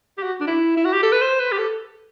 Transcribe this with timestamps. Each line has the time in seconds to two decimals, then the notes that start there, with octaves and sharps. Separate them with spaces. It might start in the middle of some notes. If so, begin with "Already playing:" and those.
0.18 G4
0.22 F#4
0.41 D4
0.47 E4
0.77 E4
0.85 F#4
0.93 G4
1.03 A4
1.12 B4
1.21 C5
1.39 B4
1.52 G4
1.58 A4